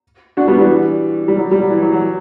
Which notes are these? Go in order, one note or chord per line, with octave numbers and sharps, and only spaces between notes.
D4 F#4
G3 B3
E3 G3
G3
F#3
G3
F#3
E3
F#3
F#3